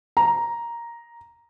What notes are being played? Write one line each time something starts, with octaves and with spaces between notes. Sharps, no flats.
A#5